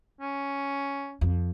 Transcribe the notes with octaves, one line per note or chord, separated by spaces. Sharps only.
C#4
F2